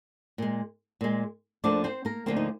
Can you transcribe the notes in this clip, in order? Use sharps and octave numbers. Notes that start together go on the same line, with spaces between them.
A#2 G#3
A#2 G#3
D2 D3 F3 A#3 D4 D5
C4 C5
A#3 A#4
D2 D3 F3 A#3 C4
D#4